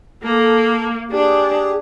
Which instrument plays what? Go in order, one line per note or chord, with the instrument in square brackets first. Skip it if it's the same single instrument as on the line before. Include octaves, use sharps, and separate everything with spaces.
[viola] A#3 [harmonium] A4
[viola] D4 [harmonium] G4 G#4